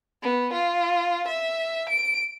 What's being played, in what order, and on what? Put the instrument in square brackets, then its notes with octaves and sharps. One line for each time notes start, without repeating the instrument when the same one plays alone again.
[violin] B3
F4
E5
D7